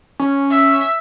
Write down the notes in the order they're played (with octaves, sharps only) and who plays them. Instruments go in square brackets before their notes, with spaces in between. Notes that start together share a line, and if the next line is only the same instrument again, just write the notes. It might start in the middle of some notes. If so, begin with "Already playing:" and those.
[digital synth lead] C#4
[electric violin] E5